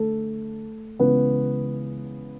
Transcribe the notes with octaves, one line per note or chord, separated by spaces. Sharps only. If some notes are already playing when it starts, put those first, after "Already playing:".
Already playing: D3 A3 A4
C#2 C#3 E3 G#3 B3 B4